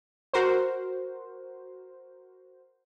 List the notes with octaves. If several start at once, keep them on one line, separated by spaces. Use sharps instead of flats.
F#4 A#4 C5